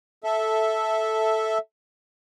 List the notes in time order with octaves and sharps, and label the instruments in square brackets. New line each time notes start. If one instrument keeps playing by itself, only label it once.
[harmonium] A4 E5